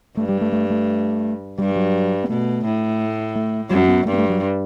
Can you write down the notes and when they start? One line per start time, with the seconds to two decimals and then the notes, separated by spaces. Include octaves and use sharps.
0.17 G2 A3
0.29 G3
0.41 A3
0.52 A3
0.70 A3
1.58 G2 G3
1.76 F#3
2.24 B3
2.29 B2 A3
2.65 A2
3.35 A3
3.70 F#2 G3
3.88 B3
4.05 G2 A3
4.13 B3
4.18 A3
4.30 F#3